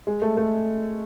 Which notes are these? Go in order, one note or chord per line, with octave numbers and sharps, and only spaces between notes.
G#3
A3
A3